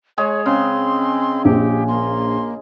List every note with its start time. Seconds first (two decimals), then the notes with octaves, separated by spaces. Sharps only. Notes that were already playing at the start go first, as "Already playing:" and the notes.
0.18 G#3 G#4 C#5
0.46 C#3 C4 C6
1.45 A#1 G4
1.88 A#3 C6